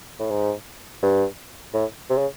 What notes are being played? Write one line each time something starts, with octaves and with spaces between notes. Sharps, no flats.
A2
G#2
G2
A2
C3
C#3